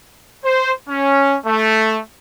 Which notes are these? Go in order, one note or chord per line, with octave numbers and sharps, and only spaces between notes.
C5
C#4
A3